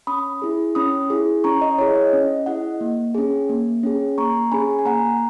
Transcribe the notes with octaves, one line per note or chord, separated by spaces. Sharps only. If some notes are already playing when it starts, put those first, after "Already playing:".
C#4 B5 D#6
E4 G#4
C#4 B5 D#6
E4 G#4
C#4 A#5 C#6
D#5
E4 G#4 C#5
D#5
C#4
E4 G#4 D#5 F#5
A#3
C#4 G#4
A#3
C#4 G#4
A#3 A#5 C#6
C#4 G#4 G#5 B5
G#5
A#3 F#5 A#5